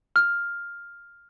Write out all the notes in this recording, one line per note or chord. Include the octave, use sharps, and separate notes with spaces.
F6